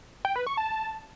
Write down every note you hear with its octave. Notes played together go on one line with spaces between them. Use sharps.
G5
B4
C#6
A5